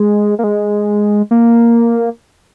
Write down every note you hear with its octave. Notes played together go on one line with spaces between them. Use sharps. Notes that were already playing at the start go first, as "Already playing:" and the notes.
Already playing: G#3
A#3
G#3
A#3